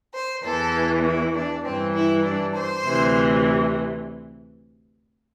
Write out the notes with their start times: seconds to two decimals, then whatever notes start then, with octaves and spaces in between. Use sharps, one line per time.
0.14 C5
0.44 E2 E3 A4
1.04 E4
1.34 D4
1.65 G2 E3 C4
1.94 E4
2.24 D4
2.54 C5
2.85 D2 C3 E3